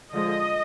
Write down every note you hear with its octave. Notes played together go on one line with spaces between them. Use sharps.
D3 F3 G#3 D#5